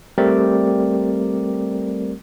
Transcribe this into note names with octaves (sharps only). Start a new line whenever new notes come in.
G3 A3 C4 G4 A#4 D5